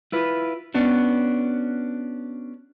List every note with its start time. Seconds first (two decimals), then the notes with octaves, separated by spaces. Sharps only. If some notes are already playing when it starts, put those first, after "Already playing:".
0.12 E4 F4 B4
0.74 B3 C#4 D4 F#4